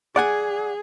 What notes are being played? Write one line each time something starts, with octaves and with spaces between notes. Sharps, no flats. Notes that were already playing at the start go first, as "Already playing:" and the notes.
G#4 D5 F#5 G#5